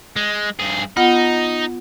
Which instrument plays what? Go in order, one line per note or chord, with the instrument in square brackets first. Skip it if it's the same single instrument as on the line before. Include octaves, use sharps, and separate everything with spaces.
[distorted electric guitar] G#3
G2 G#4
[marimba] B3 F4 F#5 [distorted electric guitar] D#4